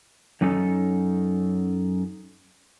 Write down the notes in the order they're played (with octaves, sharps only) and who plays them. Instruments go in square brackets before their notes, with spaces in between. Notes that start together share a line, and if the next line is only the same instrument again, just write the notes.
[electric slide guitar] F#2 F#3 C#4 D#4 A4